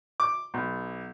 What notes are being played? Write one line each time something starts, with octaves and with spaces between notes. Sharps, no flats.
D6
B1